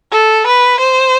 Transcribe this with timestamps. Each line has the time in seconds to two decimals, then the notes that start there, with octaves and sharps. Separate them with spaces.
0.12 A4
0.47 B4
0.80 C5